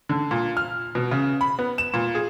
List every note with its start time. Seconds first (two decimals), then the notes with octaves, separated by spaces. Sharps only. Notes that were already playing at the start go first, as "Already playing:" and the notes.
0.09 D3
0.31 A#2
0.57 F6
0.95 B2
1.11 C#3
1.41 B5
1.59 B3
1.78 E7
1.94 A#2
2.15 G#4